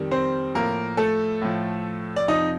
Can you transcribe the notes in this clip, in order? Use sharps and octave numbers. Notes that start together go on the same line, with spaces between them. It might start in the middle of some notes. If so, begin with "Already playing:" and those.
Already playing: F2 D#3 G3
C4 C5
A2 F3 A#3 A#4
A3 A4
A2 F3
D5
F2 C3 F3 D#4 D#5